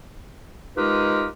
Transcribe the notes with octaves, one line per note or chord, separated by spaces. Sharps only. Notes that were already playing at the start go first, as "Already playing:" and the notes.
G#3 D#4 F4 G4 A#4 B4